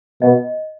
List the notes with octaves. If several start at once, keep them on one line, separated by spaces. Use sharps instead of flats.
B2 D#5